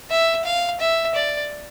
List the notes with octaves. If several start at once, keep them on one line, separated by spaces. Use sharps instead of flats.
E5
F5
E5
D5